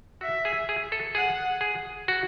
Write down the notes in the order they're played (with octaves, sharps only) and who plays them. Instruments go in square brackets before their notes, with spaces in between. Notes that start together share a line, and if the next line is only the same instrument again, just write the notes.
[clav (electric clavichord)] F#4 [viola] E5
[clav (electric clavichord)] G#4
G#4
A4
[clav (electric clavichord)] G#4 [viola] F#5
[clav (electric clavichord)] G#4
F#4